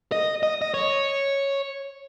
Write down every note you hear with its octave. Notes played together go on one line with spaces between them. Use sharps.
D#5
D#5
D#5
C#5